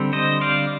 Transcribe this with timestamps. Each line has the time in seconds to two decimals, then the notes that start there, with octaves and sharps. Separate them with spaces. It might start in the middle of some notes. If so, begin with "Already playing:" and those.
Already playing: D3 G3 C4
0.13 C5 D#5
0.41 D5 F5